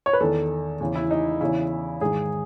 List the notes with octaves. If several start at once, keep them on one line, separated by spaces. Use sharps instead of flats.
C#5
B4
E2 D#3 A4
E2 C#3 E3
E4
D#4
E2 C#3 E3 E4
G#2 D#3 G#4